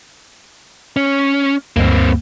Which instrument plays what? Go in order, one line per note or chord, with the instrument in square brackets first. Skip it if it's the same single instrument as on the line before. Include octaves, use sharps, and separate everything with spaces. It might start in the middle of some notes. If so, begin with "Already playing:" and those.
[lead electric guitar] C#4
[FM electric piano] D2 G2 [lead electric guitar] A#3 C4